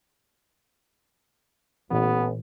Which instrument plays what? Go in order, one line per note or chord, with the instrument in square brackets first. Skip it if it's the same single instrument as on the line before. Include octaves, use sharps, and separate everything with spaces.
[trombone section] A1 [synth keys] A#2 E3 [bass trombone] B3